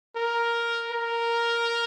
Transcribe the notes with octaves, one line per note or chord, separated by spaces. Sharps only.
A#4
A#4